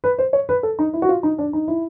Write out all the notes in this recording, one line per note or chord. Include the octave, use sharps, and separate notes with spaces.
B4
C5
C#5
B4
A4
D#4
E4
F#4
F4
D#4
D4
D#4
E4